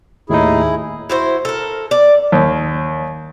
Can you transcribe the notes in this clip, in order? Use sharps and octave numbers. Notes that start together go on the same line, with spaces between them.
D#2 A2 D#4 E4 G#4
E4 F#4 C5
A4 A#4
D5
D#2